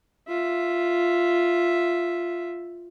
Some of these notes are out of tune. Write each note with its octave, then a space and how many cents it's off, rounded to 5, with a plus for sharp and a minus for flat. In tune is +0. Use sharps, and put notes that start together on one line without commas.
F4 +0 E5 +0